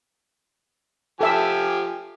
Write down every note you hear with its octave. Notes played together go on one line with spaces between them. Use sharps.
F3 G4 A4 E5 G#5 E6